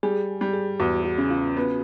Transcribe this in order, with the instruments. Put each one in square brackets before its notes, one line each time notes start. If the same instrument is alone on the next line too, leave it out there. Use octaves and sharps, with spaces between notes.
[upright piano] G3 [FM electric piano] G#4
[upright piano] G3
[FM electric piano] G#4
[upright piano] E2 [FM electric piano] F#4
[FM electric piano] F#4
[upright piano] C#3
[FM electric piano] F4
[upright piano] B3